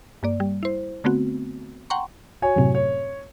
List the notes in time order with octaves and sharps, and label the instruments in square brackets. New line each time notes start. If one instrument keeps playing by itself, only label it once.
[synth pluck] G2 A#3 D5
G3
E4 C5
D3 A3 B3 C4 F#4
F#5 G5 A#5 C6 C#6
[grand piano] F#4 C#5 G#5
[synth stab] F#2 A2 C3
[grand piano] C#5